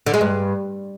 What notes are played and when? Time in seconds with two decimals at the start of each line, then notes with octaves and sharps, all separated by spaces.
0.06 D3
0.14 G#3
0.21 G2